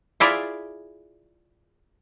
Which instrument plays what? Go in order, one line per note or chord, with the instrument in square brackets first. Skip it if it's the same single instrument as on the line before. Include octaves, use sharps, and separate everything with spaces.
[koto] E4 F4 G#4 D5 E5